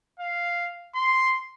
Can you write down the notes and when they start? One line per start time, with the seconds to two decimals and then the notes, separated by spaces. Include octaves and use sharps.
0.20 F5
0.96 C6